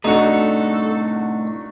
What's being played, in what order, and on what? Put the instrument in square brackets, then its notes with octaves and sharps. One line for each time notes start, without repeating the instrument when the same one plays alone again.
[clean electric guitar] A2 C3 [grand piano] A3 D4 F#4 [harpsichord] D#4 F#5 [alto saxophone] A4